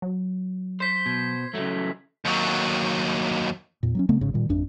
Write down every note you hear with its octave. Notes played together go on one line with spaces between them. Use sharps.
F#3
C5 B6 C7
B2 G#6
C#3 F#3 A3
D#2 F#3
E2 A#2
F#3 B3 C#4
C#3 A3 B3 C4
G#1 G#2 C#3
A#2 D#3 G3
G#1 F2 D4